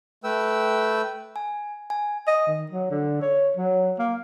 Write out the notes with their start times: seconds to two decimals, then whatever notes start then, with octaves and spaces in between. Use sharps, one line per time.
0.24 A3 B4 G5 E6
1.36 G#5
1.90 G#5
2.27 D#5
2.47 D#3
2.71 F#3
2.91 D3
3.22 C#5
3.57 F#3
3.99 A#3